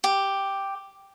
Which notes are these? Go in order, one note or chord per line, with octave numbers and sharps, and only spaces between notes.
G4